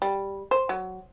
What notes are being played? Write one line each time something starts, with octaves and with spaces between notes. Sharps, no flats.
G3
C5
F#3